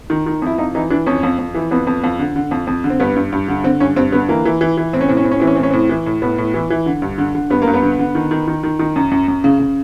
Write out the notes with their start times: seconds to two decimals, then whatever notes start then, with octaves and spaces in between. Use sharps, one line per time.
0.10 D#3
0.26 D#3
0.42 F2 E4
0.58 F2 D#4
0.75 E3 D#4
0.90 E3 D4
1.06 F2 C#4
1.23 F2
1.39 F2
1.54 E3
1.71 F2 B3
1.87 F2
2.04 F2
2.19 D3
2.36 D3
2.51 F2
2.67 F2
2.84 D3
2.90 C4
3.00 G2 B3
3.16 G2
3.32 G2
3.48 D3
3.64 D3 C4
3.80 G2 C#4
3.96 G2 C4
4.12 D3 B3
4.28 E3 A#3
4.45 E3
4.61 E3
4.77 E3
4.93 A2 C4
5.01 C#4
5.08 A2 C4
5.17 C#4
5.24 A2 C4
5.31 C#4
5.40 E3 C4
5.47 C#4
5.56 A2 C4
5.63 C#4
5.71 A2 C4
5.89 E3
6.06 A2
6.22 A2 B3
6.38 A2
6.54 E3
6.70 E3
6.86 D3
7.02 G2
7.18 D3
7.35 D3
7.50 G2 B3
7.62 A#3
7.67 G2
7.74 B3
7.83 D3
7.99 D3
8.15 D#3
8.31 D#3
8.48 D#3
8.63 D#3
8.79 D#3
8.96 F#2
9.11 F#2
9.28 F#2
9.44 C#3
9.59 C#3